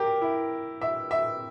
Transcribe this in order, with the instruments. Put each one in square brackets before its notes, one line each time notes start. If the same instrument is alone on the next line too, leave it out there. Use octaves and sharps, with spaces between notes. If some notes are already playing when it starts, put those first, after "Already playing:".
Already playing: [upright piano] G4 A#4
E4
E5
E5